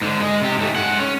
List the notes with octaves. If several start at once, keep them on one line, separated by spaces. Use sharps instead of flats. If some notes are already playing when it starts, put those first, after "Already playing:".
G#2 D3
G#3 D#5
C3 G4
G#2 A3
G#3 F#5
C#4